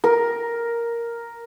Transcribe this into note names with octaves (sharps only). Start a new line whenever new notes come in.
A#4